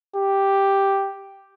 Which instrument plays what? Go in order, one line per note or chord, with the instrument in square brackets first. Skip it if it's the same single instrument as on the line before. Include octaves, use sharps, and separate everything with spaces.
[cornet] G4